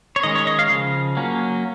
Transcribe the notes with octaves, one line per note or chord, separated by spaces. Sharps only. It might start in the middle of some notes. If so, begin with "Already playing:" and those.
C#5
D#3 G#3 C#4 D#5
C#5
D#5
F5
C#3 F3
F#3 A#3 C#4